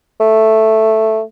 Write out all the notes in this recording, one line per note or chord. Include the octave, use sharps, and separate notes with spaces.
A3